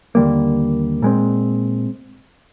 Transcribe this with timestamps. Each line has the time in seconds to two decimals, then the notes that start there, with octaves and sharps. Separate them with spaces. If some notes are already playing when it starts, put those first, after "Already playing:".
0.15 D#2 D3 G3 A#3
1.02 A#2 G#3 C4